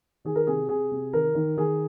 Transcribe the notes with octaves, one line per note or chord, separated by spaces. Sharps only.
D#3 G#4
A#4
C3 G#4
C3 G#4
C3
D#3 A#4
D#3
D#3 G#4